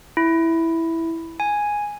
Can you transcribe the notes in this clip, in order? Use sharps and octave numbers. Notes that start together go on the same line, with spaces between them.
E4
G#5